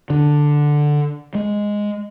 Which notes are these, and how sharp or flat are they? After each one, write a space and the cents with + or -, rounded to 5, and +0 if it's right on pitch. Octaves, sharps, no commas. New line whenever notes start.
D3 +5
G#3 -5